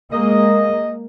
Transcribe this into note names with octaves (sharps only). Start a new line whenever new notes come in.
G#3 A#3 D#5